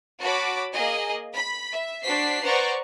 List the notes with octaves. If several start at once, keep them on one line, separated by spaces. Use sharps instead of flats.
F#4 C#5 A5 B5 D6
A#3 G#4 D#5 G#5
B5 B6
E5
D4 F#4 C5 B6 C7
B4 C5 D5 F#5 A#5 C#6